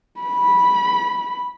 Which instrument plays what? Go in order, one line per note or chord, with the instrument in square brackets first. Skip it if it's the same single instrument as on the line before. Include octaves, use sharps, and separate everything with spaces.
[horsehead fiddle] B5